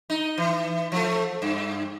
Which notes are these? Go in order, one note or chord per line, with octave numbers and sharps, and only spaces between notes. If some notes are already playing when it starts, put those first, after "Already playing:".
D#4
E3
F3 A3
G2